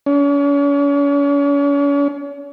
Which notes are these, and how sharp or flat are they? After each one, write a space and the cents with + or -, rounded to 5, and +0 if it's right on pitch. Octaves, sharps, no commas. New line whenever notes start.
C#4 +40